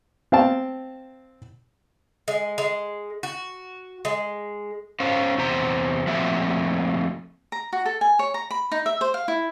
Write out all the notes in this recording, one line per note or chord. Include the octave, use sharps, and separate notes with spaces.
C4 F5 G5 A5
G#3
G#3
F#4
G#3
C#4 C5 F5
E2 C3 C5 A#5
F3 A3 A#3 C4 F#4 E5
A#5
F#4
A4
G#5
C#5
A#5
B5
D#4
E5
C5
F5
E4